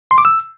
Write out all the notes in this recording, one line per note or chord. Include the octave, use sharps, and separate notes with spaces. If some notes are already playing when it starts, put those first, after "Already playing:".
C6
D6
E6